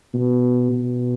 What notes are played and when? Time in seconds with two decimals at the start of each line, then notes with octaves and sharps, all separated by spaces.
0.14 B2
0.72 B2